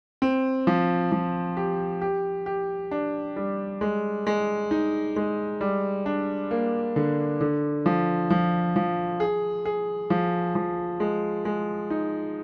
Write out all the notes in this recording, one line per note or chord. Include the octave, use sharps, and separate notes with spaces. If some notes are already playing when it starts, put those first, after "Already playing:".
C4
F3
F3
G4
G4
G4
D4
G3
G#3
G#3
D#4
G#3
G3
D4
A#3
D3
D3
F3
F3
F3
G#4
G#4
F3
F3
G#3
G#3
D#4